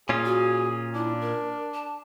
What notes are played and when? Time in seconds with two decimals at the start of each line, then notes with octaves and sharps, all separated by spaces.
0.09 A#2 C#4 F4 G#4
0.25 F#4
0.95 D4 E4
1.21 A#4
1.74 A5